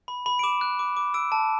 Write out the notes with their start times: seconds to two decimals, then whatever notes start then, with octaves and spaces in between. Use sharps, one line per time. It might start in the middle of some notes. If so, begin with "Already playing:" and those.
0.08 B5
0.26 B5
0.39 D7
0.43 D6 E7
0.61 F#6
0.79 D6
0.97 D6
1.14 E6 D7
1.32 A5